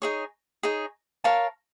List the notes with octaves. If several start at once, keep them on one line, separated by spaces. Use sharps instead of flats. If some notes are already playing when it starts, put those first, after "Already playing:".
D#4 G#4 C#5
D#4 G#4 C#5
A#4 C#5 F5 A5